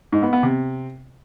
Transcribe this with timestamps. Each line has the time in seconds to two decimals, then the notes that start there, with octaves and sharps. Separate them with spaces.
0.12 G#2
0.23 B3
0.33 B3
0.43 C3